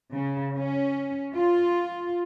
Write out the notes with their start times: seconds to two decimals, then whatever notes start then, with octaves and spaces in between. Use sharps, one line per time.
0.14 C#3
0.58 C#4
1.35 F4